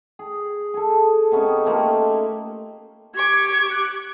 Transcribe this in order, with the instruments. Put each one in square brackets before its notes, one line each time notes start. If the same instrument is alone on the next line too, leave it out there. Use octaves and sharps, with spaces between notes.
[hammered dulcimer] G#4
G#4 A4
C3 B3 C#4 D#4
A3 A#3 F4 G4
[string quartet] G4 C#6 D6 [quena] G#6
[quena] F#6